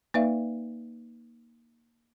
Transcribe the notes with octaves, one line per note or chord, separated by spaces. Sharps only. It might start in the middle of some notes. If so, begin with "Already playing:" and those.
A#3 D#4 B4 D5 E5 F5